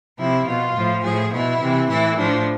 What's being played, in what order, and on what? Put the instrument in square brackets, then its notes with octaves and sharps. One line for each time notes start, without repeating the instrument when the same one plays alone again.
[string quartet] C3 F3 E4
B2 F4
A2 F3
A2 F3 G#4
B2 E4
C3 E3
A2 E3 E4
A2 F3 D4